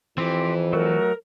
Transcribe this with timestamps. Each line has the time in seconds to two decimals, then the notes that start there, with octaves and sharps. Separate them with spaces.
0.18 F2 E3 C4 G4
0.73 F#3 A3 F#4 A#4